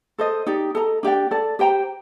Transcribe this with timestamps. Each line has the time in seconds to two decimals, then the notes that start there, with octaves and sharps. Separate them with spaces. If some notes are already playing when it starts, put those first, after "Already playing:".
0.19 A4 C5 D#5
0.46 D#4 G4 D5
0.75 A4 D#5 A#5
1.03 D4 G4 D5 G5
1.31 A4 D5 A5
1.59 G4 C5 G5 A#5